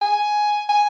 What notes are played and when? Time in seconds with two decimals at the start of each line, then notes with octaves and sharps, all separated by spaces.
0.02 G#5
0.69 G#5